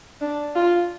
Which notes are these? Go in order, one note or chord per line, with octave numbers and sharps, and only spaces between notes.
D4
F4